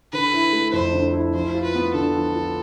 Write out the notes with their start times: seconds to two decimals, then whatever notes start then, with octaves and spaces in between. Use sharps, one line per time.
0.13 D3 B4
0.33 E4
0.53 A3
0.73 F2 C5
0.93 D3
1.14 E4
1.34 F3 C5
1.54 F4
1.64 B4
1.75 B3
1.94 D3 A4
2.15 F3
2.35 F4